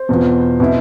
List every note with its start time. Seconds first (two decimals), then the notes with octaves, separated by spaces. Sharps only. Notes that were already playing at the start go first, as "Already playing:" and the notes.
Already playing: C5
0.09 E2 B2 B3 F4
0.60 B2 B3 E4